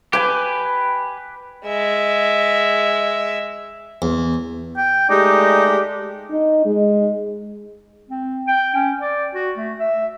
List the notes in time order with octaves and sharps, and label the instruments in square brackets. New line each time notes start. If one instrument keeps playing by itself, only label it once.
[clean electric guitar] G4 [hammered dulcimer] B4 G#5
[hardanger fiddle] G#3 E5
[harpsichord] E2
[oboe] G5
[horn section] G#3 A3 G4 [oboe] D#4 [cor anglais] D5
[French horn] D#4
G#3
[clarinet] C4
G5
C#4
D5
F#4
A3
E5